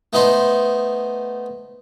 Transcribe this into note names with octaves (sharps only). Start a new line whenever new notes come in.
A3 B3 D#4 C5